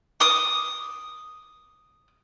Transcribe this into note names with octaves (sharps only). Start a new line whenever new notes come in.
D6 D#6